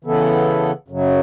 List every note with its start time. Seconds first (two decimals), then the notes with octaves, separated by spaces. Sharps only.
0.04 C#3 E3 B3 E4 A4
0.88 F#2 C#3 F#3